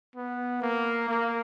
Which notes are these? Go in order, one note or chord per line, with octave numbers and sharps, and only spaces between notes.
B3
A#3
A#3